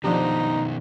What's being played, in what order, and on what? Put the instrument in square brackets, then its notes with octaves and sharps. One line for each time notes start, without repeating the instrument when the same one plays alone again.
[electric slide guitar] B2 D#3 [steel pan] F3 D4 G4 [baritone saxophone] D#4